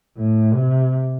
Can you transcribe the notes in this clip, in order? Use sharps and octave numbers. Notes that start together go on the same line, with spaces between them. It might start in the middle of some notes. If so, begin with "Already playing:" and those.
A2
C3